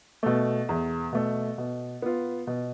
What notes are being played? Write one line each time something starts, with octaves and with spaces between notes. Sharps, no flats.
B2 A3
E2
B2 A3
B2
B3 F4
B2